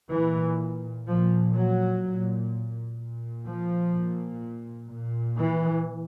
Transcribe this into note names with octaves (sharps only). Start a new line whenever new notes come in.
A#2 E3
A#2 F3
F#3
A#2
A#2
F3
A#2
A#2
E3